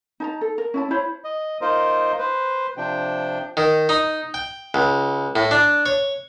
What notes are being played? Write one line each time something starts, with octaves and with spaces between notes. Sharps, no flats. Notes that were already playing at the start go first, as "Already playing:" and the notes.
D#4 A5 A#5
A4
A#4
C#4 E4 A5
E4 C5 C#5 B5
D#5
A#3 D#4 F4 A#4 C5 D#5
B4 C5
C3 F3 D4 G5
D#3
D#4
G5
C#2
A2
D4
C#5